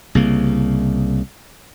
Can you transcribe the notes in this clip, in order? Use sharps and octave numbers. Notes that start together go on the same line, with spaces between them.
C2 C#3 A#3